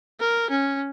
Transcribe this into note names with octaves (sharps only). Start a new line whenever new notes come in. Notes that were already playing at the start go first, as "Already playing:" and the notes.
A#4
C#4